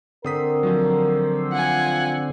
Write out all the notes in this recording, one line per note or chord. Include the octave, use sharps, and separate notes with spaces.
D3 C4 A4 A#4 D#6 B6
F3 F#3
F4 F#5 G#5